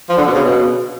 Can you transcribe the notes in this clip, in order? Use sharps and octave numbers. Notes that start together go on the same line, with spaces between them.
F3
D3
B2
C#3
B2